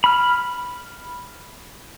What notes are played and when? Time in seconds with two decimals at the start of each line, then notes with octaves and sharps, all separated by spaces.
0.04 B5 F6